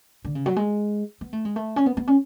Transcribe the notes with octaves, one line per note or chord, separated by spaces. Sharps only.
D3
C#3
F#3
G#3
B3
A3
G#3
A3
C#4
B3
B3
C#4